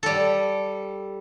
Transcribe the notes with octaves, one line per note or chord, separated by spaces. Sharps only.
G3 A4